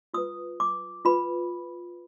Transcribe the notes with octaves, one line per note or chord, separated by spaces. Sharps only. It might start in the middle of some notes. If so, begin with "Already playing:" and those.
F4 B4 D#6
D6
F4 B4 B5